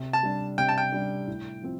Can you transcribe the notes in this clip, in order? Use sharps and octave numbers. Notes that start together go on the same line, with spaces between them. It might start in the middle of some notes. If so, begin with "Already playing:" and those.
Already playing: C3
A5
G3 D4
C3 G5
A5
G5
G3 D4
A2
F3 C4